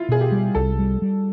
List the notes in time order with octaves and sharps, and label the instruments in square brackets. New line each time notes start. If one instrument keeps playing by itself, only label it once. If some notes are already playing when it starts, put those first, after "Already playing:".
Already playing: [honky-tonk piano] E4 F4
[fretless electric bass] B2 [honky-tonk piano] G#4
[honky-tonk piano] G4
[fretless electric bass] G3
[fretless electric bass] C2 [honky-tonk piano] A4
[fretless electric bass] G3
G3